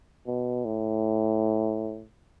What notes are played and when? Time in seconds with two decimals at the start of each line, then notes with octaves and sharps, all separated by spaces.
0.27 B2
0.65 A2